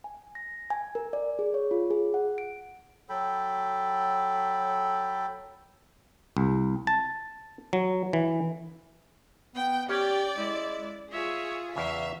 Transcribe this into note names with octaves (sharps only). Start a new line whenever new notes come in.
G#5
A#6
G#5
A#4
D5
G#4
C#5
F4
G#4
F#5
D7
F#3 A4 G5 B5
C2
A5
F#3
E3
B3 G5
C#4 G4 D5 G5
G#3 E4
F4 G#4 C#5 E5
E2 C#3 E5 F5